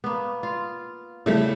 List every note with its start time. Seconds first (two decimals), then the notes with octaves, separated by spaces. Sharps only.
0.04 A#3 B3
0.43 F4
1.26 C#3 G3 A3 E4